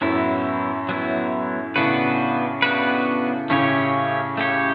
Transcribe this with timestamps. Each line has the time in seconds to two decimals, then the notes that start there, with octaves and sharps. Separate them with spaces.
0.01 F#2 A2 F#3 B3 E4
0.89 F#3 B3 E4
1.76 A2 C#3 B3 D4 F#4 B4
2.62 B3 D4 F#4 B4
3.50 A2 C#3 A3 C#4 G4 C#5
4.37 A3 C#4 G4 C#5